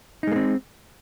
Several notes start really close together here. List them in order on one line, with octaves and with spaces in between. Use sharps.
D#4 G#3 A#3 C4